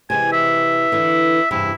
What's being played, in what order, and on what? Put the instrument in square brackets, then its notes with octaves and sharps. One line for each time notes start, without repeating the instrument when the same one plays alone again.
[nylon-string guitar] C3 E3 G#3 [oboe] G#5
[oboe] E5
[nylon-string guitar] D3 E3
[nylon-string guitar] E2 G2 C3 [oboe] E4